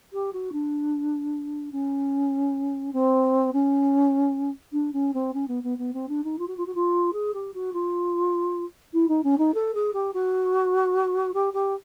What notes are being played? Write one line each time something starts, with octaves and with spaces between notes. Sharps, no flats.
G4
F#4
D4
C#4
C4
C#4
D4
C#4
C4
C#4
B3
B3
B3
C4
D4
D#4
F4
F#4
F4
F#4
F4
G#4
G4
F#4
F4
E4
D#4
C#4
D#4
A4
G#4
G4
F#4
G4
G4